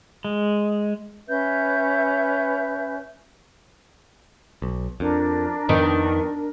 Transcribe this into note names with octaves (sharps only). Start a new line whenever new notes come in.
G#3
C#4 B4 E5 G6
B1
F2 D4 A#4
F2 D#3 B3